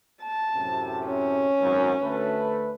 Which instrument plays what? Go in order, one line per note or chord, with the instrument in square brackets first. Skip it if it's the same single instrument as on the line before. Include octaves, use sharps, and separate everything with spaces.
[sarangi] A5
[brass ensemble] F#2 A2 C3
[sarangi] C#4
[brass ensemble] G#1 F#2
D2 A3 B4